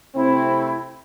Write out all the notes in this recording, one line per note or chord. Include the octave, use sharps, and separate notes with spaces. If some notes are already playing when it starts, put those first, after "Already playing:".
C3 A3 C4 E4